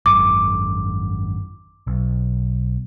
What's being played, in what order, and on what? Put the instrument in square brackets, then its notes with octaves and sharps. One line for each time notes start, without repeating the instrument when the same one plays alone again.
[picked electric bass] G#1 F#2 [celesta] D6
[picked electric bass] B1